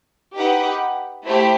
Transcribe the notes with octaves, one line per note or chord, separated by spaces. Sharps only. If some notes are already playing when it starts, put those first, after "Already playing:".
D#4 G4 B4 F#5
A3 E4 G4 C5